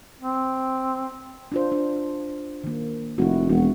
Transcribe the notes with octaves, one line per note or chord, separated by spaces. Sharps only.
C4
D4 F4 C5
D4
D#3 A#3
F1 E4 F#4
E1 F#4